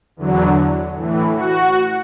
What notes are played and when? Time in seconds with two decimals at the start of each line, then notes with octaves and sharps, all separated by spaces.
0.17 E2 D3 F#3
0.96 A2 E3
1.34 F#4